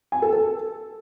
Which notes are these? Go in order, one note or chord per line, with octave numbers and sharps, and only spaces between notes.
G#5
A4
A4